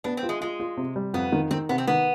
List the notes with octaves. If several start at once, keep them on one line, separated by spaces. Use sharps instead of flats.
B3 D4
C4
F4
G#3
G#3 F4
F4
C3
G3
F2 B3
D#3
D#3 C4
C3 B3
C4
D#3 B3